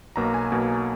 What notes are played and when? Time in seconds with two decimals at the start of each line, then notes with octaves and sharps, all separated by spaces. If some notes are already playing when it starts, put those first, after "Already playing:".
0.16 B1 B2 A#3 A#5
0.34 G#5
0.52 B1 B2 A#3